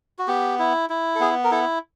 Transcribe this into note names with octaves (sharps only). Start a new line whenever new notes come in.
F#4
B3 G4
E4
E4
A4
B3 G#4
A#4
E4 A4